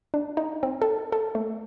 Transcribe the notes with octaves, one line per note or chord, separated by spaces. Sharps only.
D4
D#4
C4
A4
A4
A3